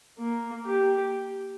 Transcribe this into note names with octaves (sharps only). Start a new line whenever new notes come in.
A#3
G4